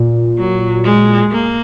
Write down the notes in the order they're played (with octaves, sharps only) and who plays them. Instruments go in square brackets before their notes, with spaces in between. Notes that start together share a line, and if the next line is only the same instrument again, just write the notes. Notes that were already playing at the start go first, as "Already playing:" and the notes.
Already playing: [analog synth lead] A#2
[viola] F#3
G#3
A#3